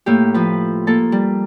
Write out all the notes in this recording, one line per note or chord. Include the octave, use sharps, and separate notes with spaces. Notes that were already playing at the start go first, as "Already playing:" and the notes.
A2 A#3 G4
F3 B4
A#3 A4 A5
G3